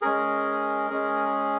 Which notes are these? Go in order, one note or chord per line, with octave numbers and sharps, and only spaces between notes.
G#3 C#4 G#4 A#4
G#3 C#4 G#4